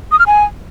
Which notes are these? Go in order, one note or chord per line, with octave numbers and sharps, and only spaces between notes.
D#6
F6
G#5